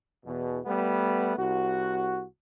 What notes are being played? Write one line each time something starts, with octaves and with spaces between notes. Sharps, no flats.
E2 B2
G3 A3 B3
C2 F#4